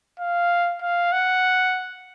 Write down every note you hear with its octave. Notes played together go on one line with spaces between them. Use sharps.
F5
F5
F#5